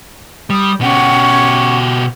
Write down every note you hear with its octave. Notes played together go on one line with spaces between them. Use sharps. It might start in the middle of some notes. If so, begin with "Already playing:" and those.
G3 D#6
B2 C#4 G4 F#5